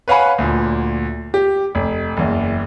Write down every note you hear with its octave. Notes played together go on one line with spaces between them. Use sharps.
B4 C#5 F5 F#5 G#5 B5
D2 A#2
G4
F1
F#1 E2